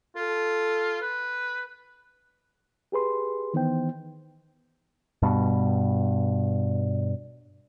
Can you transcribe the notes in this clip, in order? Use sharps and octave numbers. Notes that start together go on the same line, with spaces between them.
F4 A4
B4
G4 G#4 B4 C6
D#3 E3 B3 D#4 C5 G5
G2 B2